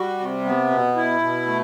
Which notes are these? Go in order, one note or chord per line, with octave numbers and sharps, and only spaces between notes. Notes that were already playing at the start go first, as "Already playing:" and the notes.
Already playing: G3 F#4
C3
B3
B2
E4
B2
A3